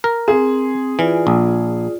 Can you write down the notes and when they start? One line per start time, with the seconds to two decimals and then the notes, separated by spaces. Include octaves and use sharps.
0.04 A#4
0.28 C4 G#4
0.99 E3 F4 D5
1.27 A#1